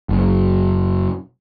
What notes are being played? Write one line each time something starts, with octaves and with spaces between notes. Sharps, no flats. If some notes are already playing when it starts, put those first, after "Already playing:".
F#1